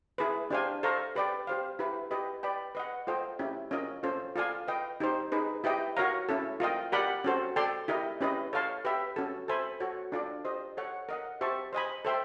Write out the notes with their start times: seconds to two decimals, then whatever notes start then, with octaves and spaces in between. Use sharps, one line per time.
0.18 E4 G#4 B4
0.50 D4 G4 C5 F5 G#5
0.83 A4 C5 F5 A#5 C#6
1.15 G4 B4 D5 G5
1.47 G4 C5 F5
1.79 E4 G4 B4
2.11 G4 B4 D#5
2.43 B4 D5 G5 B5
2.75 B4 D#5 F#5
3.07 F4 A4 C5 D#5 G5
3.39 C#4 E4 G4
3.71 C#4 F4 A#4 D#5
4.03 C#4 F4 A4 C5
4.36 F4 A4 D5 F5 G#5
4.68 B4 D#5 G5
5.00 D#4 G4 C5
5.32 D#4 G#4 B4
5.64 E4 G4 B4 D#5 G5
5.97 F#4 A#4 C#5 F5 A#5
6.29 C#4 E4 A4
6.60 F4 A#4 D#5 G5
6.92 G4 A#4 D5 F#5 B5
7.24 C#4 F#4 A4 C5
7.56 A4 D5 G5 C6
7.88 E4 G4 A#4 D#5
8.21 C#4 E4 G4 B4 D#5
8.53 A4 C#5 F5 A5 C6
8.85 G4 B4 E5 G5
9.16 C#4 F#4 A4
9.48 A4 C5 E5 G#5 B5
9.80 F#4 A4 C#5
10.12 D4 F4 A4 D5
10.45 G4 C5 D#5
10.77 A4 C#5 F#5
11.09 A#4 D#5 F#5
11.41 G4 C5 E5 A5 C#6
11.73 C5 D#5 G#5 B5
12.05 A4 C5 E5 G5 C6